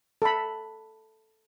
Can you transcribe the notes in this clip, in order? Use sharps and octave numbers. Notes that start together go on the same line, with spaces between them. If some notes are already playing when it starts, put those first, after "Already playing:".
A4 B5